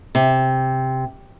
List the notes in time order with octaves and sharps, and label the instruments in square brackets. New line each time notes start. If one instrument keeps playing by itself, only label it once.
[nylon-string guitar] C3